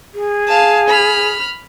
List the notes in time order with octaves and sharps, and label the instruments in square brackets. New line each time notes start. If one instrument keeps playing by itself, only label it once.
[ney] G#4
[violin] F5 A5
B5 F6